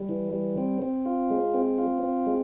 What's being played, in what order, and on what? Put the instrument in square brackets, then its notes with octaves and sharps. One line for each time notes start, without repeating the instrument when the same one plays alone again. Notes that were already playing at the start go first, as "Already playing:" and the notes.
Already playing: [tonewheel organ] G3
E3
G3
C4
C4
F4
G#3
C4
F4
C4
G#3